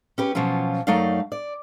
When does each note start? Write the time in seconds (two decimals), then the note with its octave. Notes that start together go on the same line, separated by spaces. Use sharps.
0.18 C#4 G4 B4
0.35 B2 F3 F#3 C#4 F4
0.87 F#2 F#3 A3 D#4 D5 F5
1.32 D5